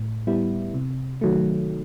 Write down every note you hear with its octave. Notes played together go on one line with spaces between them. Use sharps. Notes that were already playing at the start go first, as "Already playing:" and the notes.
Already playing: A2
G3 B3 E4
C3
D#3 F#3 A3